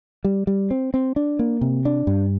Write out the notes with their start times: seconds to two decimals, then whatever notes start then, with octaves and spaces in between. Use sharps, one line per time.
0.25 G3
0.47 G3
0.71 C4
0.94 C4
1.16 D4
1.39 A#3
1.61 C3
1.85 D4
2.07 G2